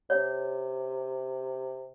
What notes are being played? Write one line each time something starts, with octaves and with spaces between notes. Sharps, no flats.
C3 C#5